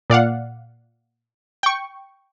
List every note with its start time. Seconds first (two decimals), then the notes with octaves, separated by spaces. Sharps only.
0.10 A#2 D5 F5 F#5
1.63 G5 C#6